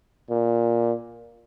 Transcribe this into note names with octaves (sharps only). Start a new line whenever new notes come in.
A#2